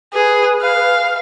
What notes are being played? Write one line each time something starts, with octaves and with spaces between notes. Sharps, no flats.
G#4 B4
F5